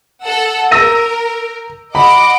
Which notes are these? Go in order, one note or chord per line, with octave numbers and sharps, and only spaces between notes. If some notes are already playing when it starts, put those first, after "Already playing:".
A4 F#5 E6
A#4 E6 A#6 D#7
D#5 F#5 B5 D6